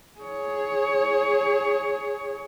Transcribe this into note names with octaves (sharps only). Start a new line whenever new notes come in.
G#4 C#5